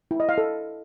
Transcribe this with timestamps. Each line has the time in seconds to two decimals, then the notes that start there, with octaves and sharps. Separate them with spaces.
0.11 E4
0.20 D#5
0.29 F5
0.38 A4